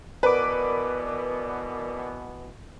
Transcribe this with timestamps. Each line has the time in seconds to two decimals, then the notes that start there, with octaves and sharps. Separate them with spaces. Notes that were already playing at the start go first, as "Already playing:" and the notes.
0.23 B2 E3 B3 A#4 B4 D5 D6